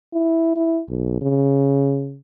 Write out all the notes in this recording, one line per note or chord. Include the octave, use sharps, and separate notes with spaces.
E4
E4
B1
C#3